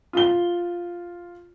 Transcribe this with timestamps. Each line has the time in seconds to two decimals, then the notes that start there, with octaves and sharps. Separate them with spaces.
0.13 F4 G7